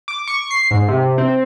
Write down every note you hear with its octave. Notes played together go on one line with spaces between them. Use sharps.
D6
C#6
C7
G#2
C3
C4